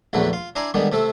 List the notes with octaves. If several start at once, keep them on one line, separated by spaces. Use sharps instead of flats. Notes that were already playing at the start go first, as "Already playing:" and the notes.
A#1 E2 D3 F#3 A3 B4
F4 C6
D4 E4 D5 G#5 A#5 C6
D3 D#3 G3 G#3 B3
C3 A3 C4 A4